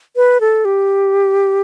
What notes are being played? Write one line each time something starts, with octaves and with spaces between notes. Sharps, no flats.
B4
A4
G4